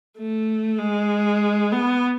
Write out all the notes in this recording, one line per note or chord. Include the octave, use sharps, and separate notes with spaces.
A3
G#3
B3